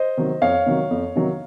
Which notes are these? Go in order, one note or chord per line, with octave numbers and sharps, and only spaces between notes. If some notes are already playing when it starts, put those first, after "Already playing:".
Already playing: C5 D#5
C3 D#3 F#3
F2 C#5 F5
C3 D#3 F#3
F2
C3 D#3 F#3